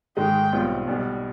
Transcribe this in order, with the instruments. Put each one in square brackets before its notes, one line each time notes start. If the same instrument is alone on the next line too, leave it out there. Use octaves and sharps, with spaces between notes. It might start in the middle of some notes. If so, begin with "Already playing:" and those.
[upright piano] G#2 D#3 G#3 [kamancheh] G5
[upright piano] B1 B2 G3 C4 F4
B1 B2 G3